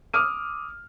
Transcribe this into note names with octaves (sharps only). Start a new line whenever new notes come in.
D6 D#6 F6 D#7